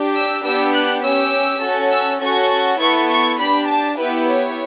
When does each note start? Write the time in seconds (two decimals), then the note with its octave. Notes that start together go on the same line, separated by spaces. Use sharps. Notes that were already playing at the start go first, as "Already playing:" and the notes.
Already playing: D4 G4
0.15 E6
0.44 B3 D4 G4 E6
0.73 F#6
1.02 C#4 G4 E6
1.61 C#4 F#4 A4
1.91 E6
2.21 C#4 F#4 A4 C#6
2.80 B3 E4 A4 C#6
3.10 C#6
3.39 D4 G4 B5
3.68 A5
3.98 B3 E4 G4 B4
4.28 C#5